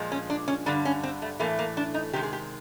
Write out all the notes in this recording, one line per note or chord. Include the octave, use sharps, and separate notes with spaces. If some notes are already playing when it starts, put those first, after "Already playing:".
Already playing: A#2 F3 G#3
C#4
D4
C#4
G2 D3 G3 D4
C#4
C4
A3
A2 E3 A3 A#3
A#3
D4
D#4
C3 D#3 G#3 G4
G#4
G4